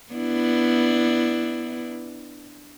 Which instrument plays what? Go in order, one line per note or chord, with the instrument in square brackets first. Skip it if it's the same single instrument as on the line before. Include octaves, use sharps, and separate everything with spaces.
[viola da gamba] B3 D4 E4